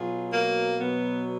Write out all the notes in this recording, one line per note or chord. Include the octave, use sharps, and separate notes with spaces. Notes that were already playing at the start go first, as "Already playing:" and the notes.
Already playing: B2 F#3 F4 G#4
A#3
B2 F#3 B3